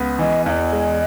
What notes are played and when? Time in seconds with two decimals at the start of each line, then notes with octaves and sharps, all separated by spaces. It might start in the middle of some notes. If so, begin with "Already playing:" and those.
Already playing: C#2 B3
0.19 E3 D#5
0.46 E2 D#5 F5
0.73 G#3